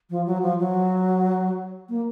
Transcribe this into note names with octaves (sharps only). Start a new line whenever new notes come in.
F3
F#3
F3
F#3
A#3